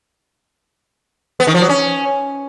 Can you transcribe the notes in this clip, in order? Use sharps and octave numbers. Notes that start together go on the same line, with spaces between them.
B3
D#3
F3
F#3
C#4